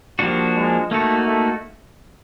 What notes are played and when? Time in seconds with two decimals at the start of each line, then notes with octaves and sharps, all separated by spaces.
0.19 F3 G3 A#3 D4 F#4
0.55 G#3
0.91 A3 A#3 D#4 F#4
1.27 A3